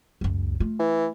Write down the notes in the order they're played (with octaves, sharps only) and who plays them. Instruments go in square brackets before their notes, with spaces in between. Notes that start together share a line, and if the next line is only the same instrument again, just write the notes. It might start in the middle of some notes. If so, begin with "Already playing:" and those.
[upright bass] C#2 F#2
A3 F4
[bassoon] E3